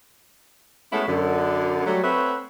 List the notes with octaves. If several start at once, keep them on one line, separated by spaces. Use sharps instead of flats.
G#3 A3 B3 C#4 E4 F#4
F#2 D3
F#3 G3 A3
A3 C4 B4 C#5 E5 F#5